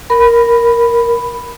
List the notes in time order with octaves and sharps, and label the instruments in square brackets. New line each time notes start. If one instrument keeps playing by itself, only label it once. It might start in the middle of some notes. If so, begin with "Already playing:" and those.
[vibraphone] A#4 B5